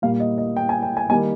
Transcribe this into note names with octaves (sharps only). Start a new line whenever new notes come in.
A#2 G3 A#3 F5
D#5
D#5
G5
G#5
G5
G#5
D#3 G3 A#3 G#5